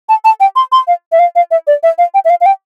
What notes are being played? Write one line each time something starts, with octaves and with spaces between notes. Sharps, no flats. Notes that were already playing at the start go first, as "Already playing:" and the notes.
A5
A5
G5
C6
C6
F5
E5
F5
F5
E5
D5
E5
F5
G5
E5
F5
F5
G5